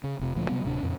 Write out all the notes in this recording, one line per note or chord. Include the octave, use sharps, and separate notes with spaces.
C#3
F1 C3
D2 A#2 F3
C3 F#3 G3 B3
D1 C3 D4
F2 A#2 C#3